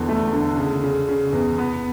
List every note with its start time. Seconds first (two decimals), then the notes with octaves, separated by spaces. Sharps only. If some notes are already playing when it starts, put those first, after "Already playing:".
Already playing: E2 D3
0.09 A3
0.33 D3
0.57 C#3
0.84 C#3
1.08 C#3
1.33 E2
1.58 B3